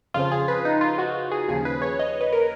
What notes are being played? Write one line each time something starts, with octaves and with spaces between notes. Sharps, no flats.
F2 C#3 F3 F4
G#4
B4
D#4
F4
F#4
G#4
D#2 C#3 F3 G#4
B4
C#5
D#5
B4
A#4